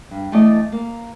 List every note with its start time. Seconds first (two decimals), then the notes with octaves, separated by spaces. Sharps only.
0.11 G2
0.32 E2 A3 A4 D5 D#5
0.72 A#3